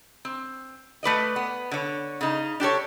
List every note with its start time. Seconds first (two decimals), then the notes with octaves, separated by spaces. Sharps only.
0.25 C4
1.03 A3 B4 D5 D#5
1.36 B3
1.71 D3 C#5
2.21 C#3 D#4
2.60 D4 G4 A4 C#5